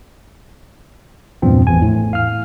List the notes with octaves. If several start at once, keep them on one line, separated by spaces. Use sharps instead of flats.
E2 G2 A#2 F3 C4
A1 E2 G#5
A2
F5 F6